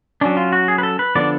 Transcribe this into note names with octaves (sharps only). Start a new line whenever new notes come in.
F#3 C#4 D4
F4
F#4
G#4
B4
A4
B4
D3 F3 B3 D4 D5